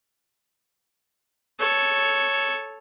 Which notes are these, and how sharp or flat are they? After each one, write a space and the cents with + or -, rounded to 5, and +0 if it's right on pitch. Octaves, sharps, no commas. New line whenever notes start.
A4 -5 C#5 +0